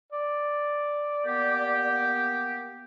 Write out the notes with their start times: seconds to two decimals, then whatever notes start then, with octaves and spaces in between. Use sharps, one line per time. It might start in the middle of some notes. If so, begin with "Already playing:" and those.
0.13 D5
1.26 A#3 B3 G4